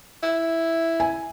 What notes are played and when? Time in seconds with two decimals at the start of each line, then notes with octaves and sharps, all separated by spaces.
0.23 E4
1.00 G#5